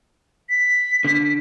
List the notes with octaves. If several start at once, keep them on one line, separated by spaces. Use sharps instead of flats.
B6
D3